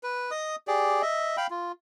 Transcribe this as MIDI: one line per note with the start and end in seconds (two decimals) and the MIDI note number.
0.03 0.31 71
0.31 0.56 75
0.31 0.56 87
0.68 1.02 67
0.68 1.02 68
0.68 1.02 74
1.02 1.37 75
1.02 1.37 76
1.37 1.47 77
1.37 1.47 79
1.37 1.47 83
1.50 1.72 65